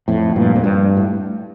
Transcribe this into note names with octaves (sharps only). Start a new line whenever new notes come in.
F2 A2
G2 A#2
F2
G2
A2